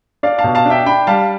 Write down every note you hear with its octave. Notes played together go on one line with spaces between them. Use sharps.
D4 D5 F5
F5 A5
B2
F5 A5
D4
E5 G5
D4 G5 B5
G3 F5 A5